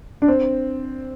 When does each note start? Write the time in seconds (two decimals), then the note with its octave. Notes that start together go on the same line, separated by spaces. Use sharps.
0.22 D4
0.28 C4